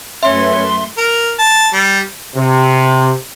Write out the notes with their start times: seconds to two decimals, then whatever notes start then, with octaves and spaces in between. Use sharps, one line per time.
0.23 F#2 A3 C#4 B4 E5 C6
0.98 A#4
1.39 A5
1.73 G3
2.35 C3